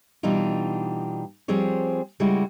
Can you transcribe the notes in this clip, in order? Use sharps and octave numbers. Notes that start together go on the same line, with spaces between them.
B2 E3 G3 D4 D#4 F4
F3 G3 C4 G#4 C#5
C#3 G3 G#3 E4 F#4